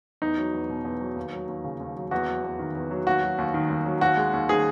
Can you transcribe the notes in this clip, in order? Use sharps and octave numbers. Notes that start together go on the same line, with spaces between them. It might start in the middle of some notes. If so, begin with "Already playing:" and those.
E2 D#4
F#3
E2
B2
E2
F#3
D#2
F#3
D#2
C#3
D#2
F#3
E2 F#4
F#3
E2
D#3
E2
F#3
D#2 F#4
F#3
D#2
D#3
D#2
F#3
D#2 F#4
G#3
D#2
D#3 G#4